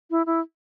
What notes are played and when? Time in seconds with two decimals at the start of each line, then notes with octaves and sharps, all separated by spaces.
0.11 E4
0.26 E4